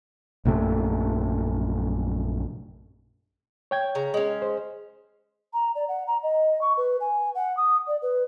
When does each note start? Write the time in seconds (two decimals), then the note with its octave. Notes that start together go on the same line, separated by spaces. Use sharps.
0.45 A#1 F#2 C3 A3
3.71 C#5 G5 G#6
3.95 C#3 A#5
4.14 G#3 C#4
4.42 C5
5.53 A#5
5.75 D5
5.88 F#5
6.07 A#5
6.23 D#5
6.61 C#6
6.77 B4
7.01 G#5
7.35 F#5
7.57 D#6
7.87 D5
8.02 B4